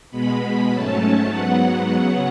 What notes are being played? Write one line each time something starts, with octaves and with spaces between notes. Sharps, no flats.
B2 G#3 B3 B5
B5
G#2 F#3 A3 C#4 A5
G#2 F#3 B3 F#5
F#5
C#3 F#3 B3 F#5